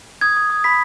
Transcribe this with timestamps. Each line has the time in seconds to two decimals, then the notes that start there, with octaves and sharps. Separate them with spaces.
0.21 D#6 G#6
0.37 D#6
0.50 D#6
0.64 B5 B6